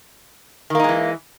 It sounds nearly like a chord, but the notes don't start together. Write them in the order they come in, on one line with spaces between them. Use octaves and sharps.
D#3 A#3 D#4 G#3 E3